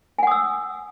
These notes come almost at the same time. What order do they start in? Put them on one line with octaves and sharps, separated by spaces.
G#5 F#5 D#6 E6